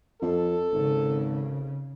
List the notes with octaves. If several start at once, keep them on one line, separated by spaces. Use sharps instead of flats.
F2 A4
G#1 C#3